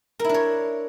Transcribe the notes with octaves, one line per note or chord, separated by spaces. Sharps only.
D4 E4 A#4 C#5